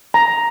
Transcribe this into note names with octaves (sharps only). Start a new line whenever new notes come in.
A#5